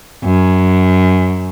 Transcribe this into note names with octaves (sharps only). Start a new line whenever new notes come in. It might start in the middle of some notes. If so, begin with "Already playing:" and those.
F#2